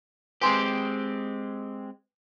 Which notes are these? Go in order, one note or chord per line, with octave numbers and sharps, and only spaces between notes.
G#3 C4 G4 B4 G#5 C6